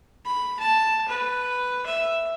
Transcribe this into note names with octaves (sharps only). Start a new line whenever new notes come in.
B5
A5
B4
E5